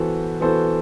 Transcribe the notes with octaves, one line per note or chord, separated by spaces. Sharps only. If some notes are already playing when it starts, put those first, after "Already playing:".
Already playing: E3 B3 F#4 A4 C5
E3 B3 F#4 A4 C5